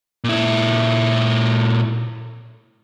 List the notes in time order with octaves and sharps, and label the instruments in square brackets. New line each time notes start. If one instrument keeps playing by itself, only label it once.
[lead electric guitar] A#2 E4